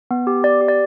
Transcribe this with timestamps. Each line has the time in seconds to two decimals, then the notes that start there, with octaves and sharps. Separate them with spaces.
0.11 B3
0.27 G4
0.44 B3 D5
0.61 G4
0.68 D5